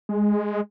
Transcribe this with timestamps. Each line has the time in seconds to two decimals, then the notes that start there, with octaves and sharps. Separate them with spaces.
0.09 G#3